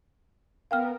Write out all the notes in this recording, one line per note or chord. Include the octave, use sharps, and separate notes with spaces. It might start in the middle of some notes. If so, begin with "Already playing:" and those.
B3 A#4 F5 G5 F6